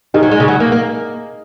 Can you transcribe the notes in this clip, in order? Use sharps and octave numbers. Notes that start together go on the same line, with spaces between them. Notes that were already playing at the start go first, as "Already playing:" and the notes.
D#3 D#4 G#4
F#3
G#3
C#3
F#3
A#3
A#3